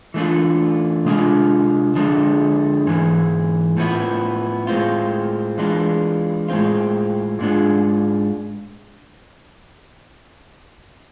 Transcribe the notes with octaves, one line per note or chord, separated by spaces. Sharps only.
E3 A3 D4 F4
C3 G#3 D4 F4
D3 F3 G#3 D4
G#2 E3 G#3
A2 F3 B3 E4
A2 G#3 C4 F4
E3 G#3 D4 F4
A2 G#3 C4 F4
G#2 G#3 D4 F4